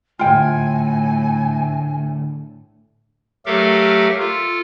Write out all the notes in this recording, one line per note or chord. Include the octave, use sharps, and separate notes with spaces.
A2 D3 A3 F4 G5 G#5
F#3 A3 G4 A4 A#4 F5
F4 A4